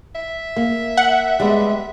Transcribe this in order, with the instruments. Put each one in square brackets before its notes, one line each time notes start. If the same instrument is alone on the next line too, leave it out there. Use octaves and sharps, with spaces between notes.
[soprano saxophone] E5
[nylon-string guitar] A#3
[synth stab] F#5
[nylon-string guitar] G3 G#3 B3